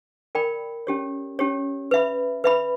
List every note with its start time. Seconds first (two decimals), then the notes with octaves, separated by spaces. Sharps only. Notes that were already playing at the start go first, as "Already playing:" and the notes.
0.35 A#4 D5 G5 B5
0.87 C#4 G4 C#5
1.39 C#4 G4 C#5
1.91 B4 E5 B5
2.44 B4 E5 B5